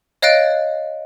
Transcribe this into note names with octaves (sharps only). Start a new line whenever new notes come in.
C#5 D#5 F5 F#6 A6 D7